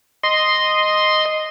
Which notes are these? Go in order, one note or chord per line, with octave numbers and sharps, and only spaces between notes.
D#5 C6